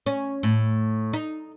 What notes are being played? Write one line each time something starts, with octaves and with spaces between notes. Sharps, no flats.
C#4
A2
D#4